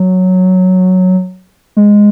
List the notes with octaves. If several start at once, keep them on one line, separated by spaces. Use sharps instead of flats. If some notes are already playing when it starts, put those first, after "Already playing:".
Already playing: F#3
G#3